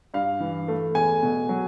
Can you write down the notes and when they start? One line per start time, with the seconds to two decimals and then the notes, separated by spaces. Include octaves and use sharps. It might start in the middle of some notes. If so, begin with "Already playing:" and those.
0.14 G2 F5
0.40 E3
0.68 A3
0.95 E2 G#5
1.23 B2
1.49 F#3